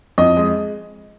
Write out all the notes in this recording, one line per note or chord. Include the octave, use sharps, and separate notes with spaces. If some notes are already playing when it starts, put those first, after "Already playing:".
F2 D#5
G#3